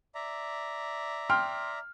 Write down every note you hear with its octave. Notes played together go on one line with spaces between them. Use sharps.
D5 E5 A#5
G5 C6 F6